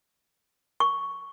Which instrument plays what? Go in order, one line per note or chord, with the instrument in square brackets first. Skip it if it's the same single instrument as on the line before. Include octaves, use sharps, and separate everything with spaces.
[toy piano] C#6